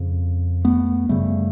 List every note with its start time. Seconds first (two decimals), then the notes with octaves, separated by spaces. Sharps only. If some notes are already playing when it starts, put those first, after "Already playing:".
Already playing: F2 C#3
0.65 A3 B3
1.09 F#2 C#3 G3 A3